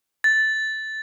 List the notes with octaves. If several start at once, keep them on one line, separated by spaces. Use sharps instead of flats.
A6